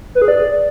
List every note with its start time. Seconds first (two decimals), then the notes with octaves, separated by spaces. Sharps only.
0.15 B4
0.22 G#4
0.28 D5